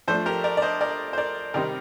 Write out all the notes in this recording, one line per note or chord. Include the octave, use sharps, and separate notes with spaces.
F3 A3 D4 A4 C5
G4 A#4
A#4 D5
D5
C5 D#5
A#4 D5
C5
A#4 D5
C3 D#3 G3 C4 D#4 A#4 D5